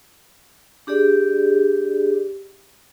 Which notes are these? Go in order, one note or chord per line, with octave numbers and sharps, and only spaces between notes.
D4 G4 G#4 D5